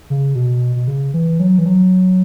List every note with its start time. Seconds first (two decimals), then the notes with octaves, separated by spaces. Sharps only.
0.10 C#3
0.35 B2
0.76 B2
0.88 C#3
1.14 E3
1.39 F#3
1.58 E3
1.66 F#3